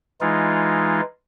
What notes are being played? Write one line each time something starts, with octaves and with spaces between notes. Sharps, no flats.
E3 G#3 D#4 F4